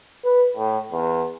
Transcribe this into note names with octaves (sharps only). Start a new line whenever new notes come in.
B4
A2
E2